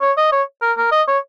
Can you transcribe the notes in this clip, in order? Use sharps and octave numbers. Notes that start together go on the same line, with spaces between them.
C#5
D#5
C#5
A#4
A#4
D#5
C#5